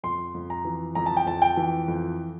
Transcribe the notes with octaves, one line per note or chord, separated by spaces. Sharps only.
F2 C6
F2
A#5
E3
F2 A#5
A5
G5
F2 A5
G5
E3
F2